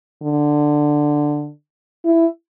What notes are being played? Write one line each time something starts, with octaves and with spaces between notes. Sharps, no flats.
D3
E4